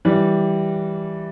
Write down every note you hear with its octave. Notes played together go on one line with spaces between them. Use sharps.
E3 G3